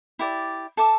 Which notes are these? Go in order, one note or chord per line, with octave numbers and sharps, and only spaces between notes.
E4 G4 D5
A4 E5 A5 D6